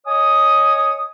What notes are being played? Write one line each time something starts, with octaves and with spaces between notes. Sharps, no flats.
C#5 D#5 G#5 D#6